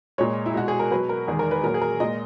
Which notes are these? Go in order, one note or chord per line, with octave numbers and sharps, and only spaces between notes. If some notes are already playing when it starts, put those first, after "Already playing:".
A#2 G#3 C#5
E4
B2 G#3 F#4
G#4
A#4
B2 F#3 B4
A#4
E2 D#3 G#3 G#4
A#4
B4
A#2 F#3 A#4
G#4
A#4
A#2 G#3 D#5